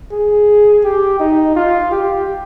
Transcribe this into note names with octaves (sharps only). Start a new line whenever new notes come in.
G#4
G4
D#4
F4
G4